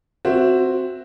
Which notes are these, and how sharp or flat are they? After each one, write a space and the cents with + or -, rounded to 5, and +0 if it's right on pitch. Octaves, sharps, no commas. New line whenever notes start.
C4 +0 F#4 +0 E5 +10